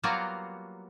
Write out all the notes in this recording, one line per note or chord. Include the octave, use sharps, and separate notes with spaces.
F#3 G3 A#3 B3 F4 F#4